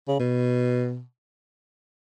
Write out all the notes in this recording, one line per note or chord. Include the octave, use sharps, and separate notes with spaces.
C#3
B2